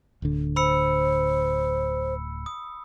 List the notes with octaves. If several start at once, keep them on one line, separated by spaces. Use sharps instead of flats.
D1 D2 D3
C5 B5 E6 C#7
D#6